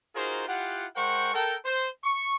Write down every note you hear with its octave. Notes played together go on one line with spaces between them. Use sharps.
D#4 F4 F#4 G#4 A#4 C5
E4 F4 G4 F#5
G#3 A#4 C5 F#5 G5 C#6
A4 A#4 G5
C5
C#6